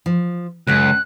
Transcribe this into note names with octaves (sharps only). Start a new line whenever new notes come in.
F3
C#2 F#2 F#4 A4 F#6